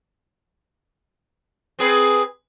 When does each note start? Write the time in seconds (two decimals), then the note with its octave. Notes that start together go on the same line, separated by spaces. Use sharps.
1.79 C4 G#4 B4